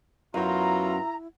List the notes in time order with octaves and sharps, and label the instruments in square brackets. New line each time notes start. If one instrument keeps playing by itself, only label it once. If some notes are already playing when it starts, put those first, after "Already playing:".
[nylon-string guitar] F#2 [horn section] F#3 B3 F4 [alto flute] E4 [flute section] A#5